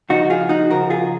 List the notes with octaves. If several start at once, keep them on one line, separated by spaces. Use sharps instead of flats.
C#3 F3 D#4 F#4
F4 G#4
D#4 F#4
C#3 F3 F#4 A#4
F4 G#4